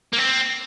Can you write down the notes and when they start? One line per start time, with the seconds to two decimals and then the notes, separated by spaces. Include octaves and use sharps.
0.13 A#3
0.18 C4